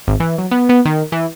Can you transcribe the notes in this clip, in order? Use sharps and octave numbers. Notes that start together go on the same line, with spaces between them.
G#1
E3
F#3
B3
B3
D#3
E3